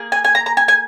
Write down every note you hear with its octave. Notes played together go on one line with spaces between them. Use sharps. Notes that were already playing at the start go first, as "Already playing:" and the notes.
Already playing: A#3 G#4
G#5
G#5
A#5
A#5
G#5
G#5